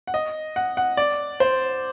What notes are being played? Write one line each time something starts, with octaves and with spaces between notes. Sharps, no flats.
F#5
D#5
F#5
F#5
D5
C5